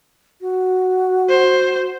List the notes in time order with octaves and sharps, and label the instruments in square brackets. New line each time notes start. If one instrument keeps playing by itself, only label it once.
[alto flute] F#4
[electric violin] C5